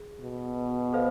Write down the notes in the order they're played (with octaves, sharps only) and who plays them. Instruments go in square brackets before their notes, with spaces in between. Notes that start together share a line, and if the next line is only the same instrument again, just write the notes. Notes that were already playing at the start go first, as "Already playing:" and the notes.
Already playing: [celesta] G#4
[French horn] B2
[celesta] A4 C5 F5